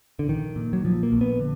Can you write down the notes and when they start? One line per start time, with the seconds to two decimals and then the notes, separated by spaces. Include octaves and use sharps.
0.19 D3
0.28 A#1 D#3
0.56 A#2
0.73 F#3
0.85 A#2 F3
1.03 A#3
1.12 A#1
1.21 B3
1.40 D3